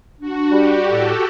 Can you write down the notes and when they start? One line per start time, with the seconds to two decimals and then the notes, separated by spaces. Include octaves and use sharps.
0.20 D4 F#4
0.52 G3 G4
0.85 A2 A4